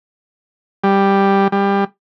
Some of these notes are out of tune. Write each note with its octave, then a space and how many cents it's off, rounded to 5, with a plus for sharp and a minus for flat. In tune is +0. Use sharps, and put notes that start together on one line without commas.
G3 +5
G3 +20